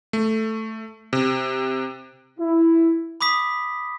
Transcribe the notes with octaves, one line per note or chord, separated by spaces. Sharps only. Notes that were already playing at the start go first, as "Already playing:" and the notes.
A3
C3
E4
B5 D6 D#6 B6